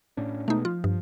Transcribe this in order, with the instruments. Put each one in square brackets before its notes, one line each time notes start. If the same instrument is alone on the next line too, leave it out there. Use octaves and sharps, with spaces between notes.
[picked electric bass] A2 C#4 D4
[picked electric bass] B2 G#3 B3 [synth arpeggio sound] A3 D#4
[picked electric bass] F3 [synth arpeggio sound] F4
[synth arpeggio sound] G2